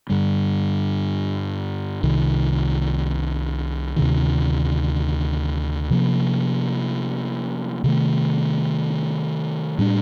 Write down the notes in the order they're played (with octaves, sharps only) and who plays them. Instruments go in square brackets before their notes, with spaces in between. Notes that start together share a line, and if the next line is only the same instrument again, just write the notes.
[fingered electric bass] G2 D3 G3
C2 C3 D#3
D2 C3 D#3
C3 F3 A#3
C3 D#3 A3
A2 G3 D4